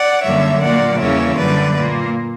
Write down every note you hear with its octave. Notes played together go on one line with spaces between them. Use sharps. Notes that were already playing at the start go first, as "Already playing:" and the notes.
Already playing: D5 F#5
F#2 D3 G3 A#3 C#5 E5
A#2 F#3 A#3 D5 F#5
E2 C#3 E3 G3 A#3 C#5 E5
F#2 D3 G3 B4 D5
A#2 A#3